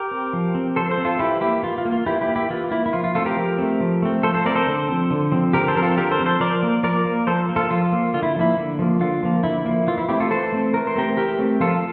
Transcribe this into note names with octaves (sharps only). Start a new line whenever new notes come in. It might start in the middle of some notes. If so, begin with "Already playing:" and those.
Already playing: G4 A#4
C4
F3
C4
F3 A4 C5
A4 C5
C4
F4 A4
E3 E4 G4
A#3 E4 G4
E3 F4
F4
A#3
F4
E3 E4 G4
E4 G4
A#3
E4 G4
E3 F4
A#3 E4
E4
F3 F4
F4
A3 C4 F4 A4
G4 A#4
F3
A3 C4
F3
A3 C4
F3 A4 C5
A4 C5
A3 C4 A#4 D5
A4 C5
D3
F3 C4
D3
F3 C4
D3 G4 A#4
A4 C5
F3 C4 A#4
F4 A4
D3 G4 A#4
A4 C5
F3 C4
A4 C5
F3 A#4 D5
A#3
F3 A#4 D5
A#3
F3 A4 C5
A#3
F4 A4
F3 F4
A#3
D3 F4
E4
F3 A#3 E4
D3
F3 A#3
D3 F4
F3 A#3
D3 E4
F3 A#3
E3 F4
E4
A3 C4 E4 G4
F4 A4
E3 A4 C5
A3 C4
E3 A#4
C5
A3 C4 G4 A#4
E3 G4 A#4
A3 C4
F3 F4 A4